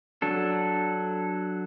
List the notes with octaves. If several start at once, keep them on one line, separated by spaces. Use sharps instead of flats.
F#3 D4 A4